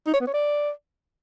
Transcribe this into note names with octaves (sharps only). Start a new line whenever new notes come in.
D#4
C#5
B3
C#5
D5